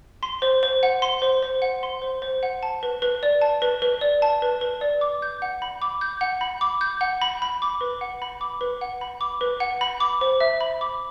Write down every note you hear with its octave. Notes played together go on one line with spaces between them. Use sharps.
C6
C5
C5
F#5
C6
C5
C5
F#5
C6
C5
C5
F#5
A5
B4
B4
D5
A5
B4
B4
D5
A5
B4
B4
D5
D6
G6
F#5
B5
D6
G6
F#5
B5
D6
G6
F#5
B5
B5
D6
B4
F#5
B5
D6
B4
F#5
B5
D6
B4
F#5
B5
D6
C5
E5
B5
D6